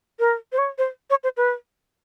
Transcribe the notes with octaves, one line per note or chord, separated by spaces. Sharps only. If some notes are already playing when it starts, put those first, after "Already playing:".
A#4
C5
C#5
C5
C#5
C5
B4